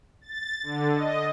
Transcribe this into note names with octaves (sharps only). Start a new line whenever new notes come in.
A6
D3
D#5